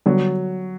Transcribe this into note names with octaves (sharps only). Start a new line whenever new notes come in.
D3 F#3 G3 B3 F#4